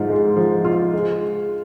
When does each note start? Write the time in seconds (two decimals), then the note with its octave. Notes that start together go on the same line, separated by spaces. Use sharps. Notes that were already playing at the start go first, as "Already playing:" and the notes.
Already playing: G#2 F3 F4
0.09 G#3
0.36 F3
0.65 F4
0.94 G#3